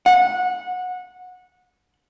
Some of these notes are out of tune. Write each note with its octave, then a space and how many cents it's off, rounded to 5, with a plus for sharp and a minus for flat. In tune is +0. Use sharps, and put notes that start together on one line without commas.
F#5 -20